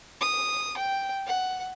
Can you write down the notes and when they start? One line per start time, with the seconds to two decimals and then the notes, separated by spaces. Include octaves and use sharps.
0.21 D#6
0.77 G5
1.26 F#5